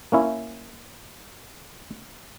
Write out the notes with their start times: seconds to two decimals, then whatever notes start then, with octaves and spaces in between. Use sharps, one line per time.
0.12 A#3 C#4 E4